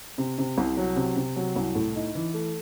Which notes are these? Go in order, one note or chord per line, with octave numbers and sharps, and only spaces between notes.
C3
C3
C2
F#3
C3
C3
F#3
C2
A2
D#4
E3
A3